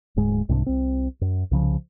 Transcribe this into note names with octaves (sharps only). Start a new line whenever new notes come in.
D1 G#2 G#3
C2 G#2 C3 D4
C2 C4
F#2
C2 C#3 F3